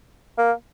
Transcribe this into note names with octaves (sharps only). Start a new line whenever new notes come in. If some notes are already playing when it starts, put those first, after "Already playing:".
A#3